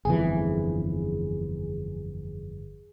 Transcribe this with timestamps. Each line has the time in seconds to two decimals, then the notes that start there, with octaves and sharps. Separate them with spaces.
0.05 G1 F2 E3 G#4